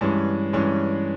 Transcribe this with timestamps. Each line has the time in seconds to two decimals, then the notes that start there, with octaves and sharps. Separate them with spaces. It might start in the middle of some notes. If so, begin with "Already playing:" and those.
0.01 G2 E3 G#3 C#4
0.53 G2 E3 G#3 C#4